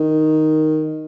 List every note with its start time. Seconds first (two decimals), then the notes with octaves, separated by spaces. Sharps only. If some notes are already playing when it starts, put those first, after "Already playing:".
Already playing: D#3